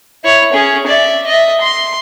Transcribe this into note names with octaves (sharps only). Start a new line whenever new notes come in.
E4 C#5
C#4 G#4
D5 E5
D#5 E5
C6